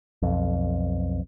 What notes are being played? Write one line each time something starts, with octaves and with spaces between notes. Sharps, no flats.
B1 F2